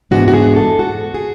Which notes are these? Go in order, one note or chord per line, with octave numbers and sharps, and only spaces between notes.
G#2 E3 G#3 B3 D4 F#4
F#4
G#4
A4
F#4
G#4